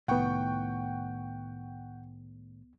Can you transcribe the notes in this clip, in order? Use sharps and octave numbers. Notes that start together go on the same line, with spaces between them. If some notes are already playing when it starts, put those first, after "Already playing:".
C2 A2 D#3 B3 F#5 G5 C#6